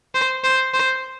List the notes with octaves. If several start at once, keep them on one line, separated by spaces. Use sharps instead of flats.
C5
C5
C5